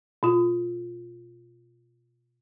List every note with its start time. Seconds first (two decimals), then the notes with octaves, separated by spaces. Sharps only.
0.23 B2 F4